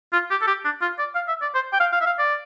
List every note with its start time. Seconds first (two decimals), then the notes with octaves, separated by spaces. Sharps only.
0.13 F4
0.31 G4
0.42 A4
0.47 G4
0.65 D4
0.82 F4
0.99 D5
1.15 F5
1.28 E5
1.42 D5
1.54 C5
1.73 G5
1.80 F5
1.92 F5
2.01 E5
2.06 F5
2.19 D5